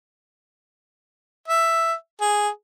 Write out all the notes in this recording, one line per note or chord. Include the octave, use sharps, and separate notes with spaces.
E5
G#4